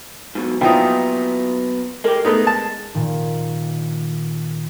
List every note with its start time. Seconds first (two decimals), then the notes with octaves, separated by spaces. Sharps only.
0.35 G#2 B2 F#3
0.61 A#2 F3 F#3 B3 D#4 E4 G5
2.04 G#3 G4 A#4
2.25 G#3 A3 B3 D#4
2.47 A5
2.95 A#2 D#3